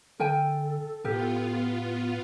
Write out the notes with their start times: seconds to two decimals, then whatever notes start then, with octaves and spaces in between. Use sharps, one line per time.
0.20 D3 A4 A#4 G5 G#5
1.05 A2 B3 F4 G4 A#4